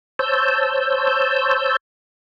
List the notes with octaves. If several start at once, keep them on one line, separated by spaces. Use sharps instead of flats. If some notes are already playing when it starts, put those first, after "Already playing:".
C5 C#5 A5 E6 G6